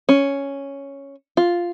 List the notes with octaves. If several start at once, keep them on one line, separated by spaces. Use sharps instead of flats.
C#4
F4